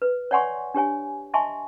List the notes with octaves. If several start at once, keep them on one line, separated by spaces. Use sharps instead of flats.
B4
C#5 D5 F#5 G#5 C6 C#6
D4 G4 C#5 G#5
D#5 E5 G#5 A5 C6 C#6